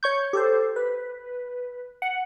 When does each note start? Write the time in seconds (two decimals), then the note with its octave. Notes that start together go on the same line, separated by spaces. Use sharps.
0.03 C#5 C#6 G6
0.33 G4 A4 C5
0.76 B4
2.02 F#5